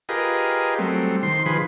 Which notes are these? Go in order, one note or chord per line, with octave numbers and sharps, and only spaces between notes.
F4 G4 G#4 A#4 B4 D#5
F#3 G3 A3 C4
D#3 C5 C6
D#3 F3 G#4 B4 B5 C6